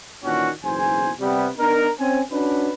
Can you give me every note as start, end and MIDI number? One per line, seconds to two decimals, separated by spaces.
0.24 0.49 46
0.24 0.49 51
0.24 0.49 52
0.24 0.49 61
0.24 0.49 62
0.24 0.49 66
0.63 1.11 30
0.63 1.11 35
0.63 1.11 40
0.63 1.11 72
0.63 1.11 80
1.20 1.46 48
1.20 1.46 55
1.20 1.46 59
1.58 1.89 59
1.58 1.89 62
1.58 1.89 63
1.58 1.89 70
2.00 2.20 60
2.00 2.20 61
2.00 2.20 72
2.00 2.20 80
2.32 2.71 61
2.32 2.71 62
2.32 2.71 66
2.32 2.71 71